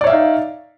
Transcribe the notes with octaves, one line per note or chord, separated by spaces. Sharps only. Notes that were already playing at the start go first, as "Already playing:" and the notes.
D#4 C#5 D5 E5 F5